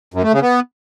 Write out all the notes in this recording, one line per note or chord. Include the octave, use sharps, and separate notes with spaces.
F#2
A3
C#3
B3